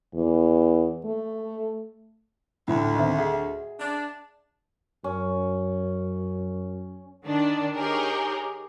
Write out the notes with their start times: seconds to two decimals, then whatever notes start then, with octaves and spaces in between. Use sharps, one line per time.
0.14 E2
1.05 A3
2.68 D2 A2
2.95 D#3 C4 D#5 E5
3.18 G#4 E5 F#5
3.80 D4
5.04 F#2 C#4
7.25 D#3 D4
7.74 D#4 G4 G#4 A#4 C#5